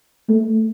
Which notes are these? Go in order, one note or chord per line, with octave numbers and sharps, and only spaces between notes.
A3